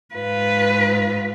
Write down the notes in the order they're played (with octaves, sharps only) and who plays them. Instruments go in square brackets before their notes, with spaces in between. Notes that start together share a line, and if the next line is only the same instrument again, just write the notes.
[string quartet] G#2 F4 [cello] B4